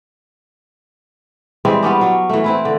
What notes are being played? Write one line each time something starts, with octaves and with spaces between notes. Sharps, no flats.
E3 G3 G#3 C4
G3 B3 C#4 D4
F#3 C#4
E3 A3
C4 E4 B4
D3